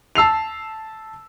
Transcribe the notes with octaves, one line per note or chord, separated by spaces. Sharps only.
A5 E6 C7 F7